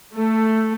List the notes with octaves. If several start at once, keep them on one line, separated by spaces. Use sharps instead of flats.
A3